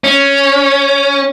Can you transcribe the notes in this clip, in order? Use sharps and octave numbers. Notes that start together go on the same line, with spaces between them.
C#4